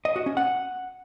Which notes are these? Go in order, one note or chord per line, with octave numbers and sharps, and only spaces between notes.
D#5
F#4
C#4
F#5